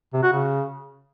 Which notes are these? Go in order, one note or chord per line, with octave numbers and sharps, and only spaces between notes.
C3
F#4
C#3